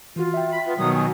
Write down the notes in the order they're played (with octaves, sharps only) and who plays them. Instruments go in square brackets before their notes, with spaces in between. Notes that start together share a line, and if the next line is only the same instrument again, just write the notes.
[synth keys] E3 F#4 [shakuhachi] F4
[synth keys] E5 G5
[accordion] B5
[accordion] B3 [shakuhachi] F4
[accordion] B2 D#3 F#3 [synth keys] G3 [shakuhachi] D#6
[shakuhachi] G#5